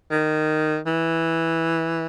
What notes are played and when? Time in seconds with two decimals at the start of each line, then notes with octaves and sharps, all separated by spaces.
0.11 D#3
0.86 E3